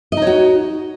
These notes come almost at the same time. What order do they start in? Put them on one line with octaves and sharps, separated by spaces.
D#5 D#4 C#5 F#4